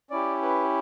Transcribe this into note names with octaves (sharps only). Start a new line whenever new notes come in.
C#4 E4 G4 D5
B4